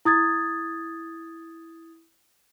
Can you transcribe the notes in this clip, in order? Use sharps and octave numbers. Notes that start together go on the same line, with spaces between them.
E4 D#6 G#6 A6